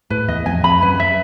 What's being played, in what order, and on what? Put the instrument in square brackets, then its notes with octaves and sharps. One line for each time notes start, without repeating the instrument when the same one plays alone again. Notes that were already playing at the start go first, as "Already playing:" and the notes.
[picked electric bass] A2 [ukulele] B4
[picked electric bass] E2 [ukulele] D#5
[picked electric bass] F2 [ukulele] G#5
[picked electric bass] F2 [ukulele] B5
[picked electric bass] F#2 [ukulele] B4
[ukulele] E5